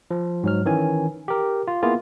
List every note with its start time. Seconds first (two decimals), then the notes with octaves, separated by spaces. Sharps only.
0.11 F3
0.43 G#2 F#3 F6
0.66 D#3 E3 C#4 G#5
1.28 G4 A#4
1.68 F4
1.82 A#3 B3 E4 F4 G#4